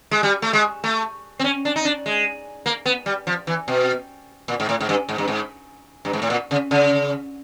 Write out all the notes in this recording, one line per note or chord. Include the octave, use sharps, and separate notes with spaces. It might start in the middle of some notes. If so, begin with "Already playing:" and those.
G#3
G3
A3
G#3
A3
C4
C#4
D4
D#4
D4
G#3
A#3
B3
G3
F3
E3
B2
A#2
G#2
A2
G#2
G2
G#2
G2
G#2
G2
G#2
A2
A#2
C#3
C#3